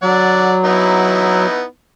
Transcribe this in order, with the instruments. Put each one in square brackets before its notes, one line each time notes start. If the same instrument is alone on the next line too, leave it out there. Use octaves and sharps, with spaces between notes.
[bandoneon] F#3 [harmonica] D5 F#5
[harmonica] B3 D#4 E4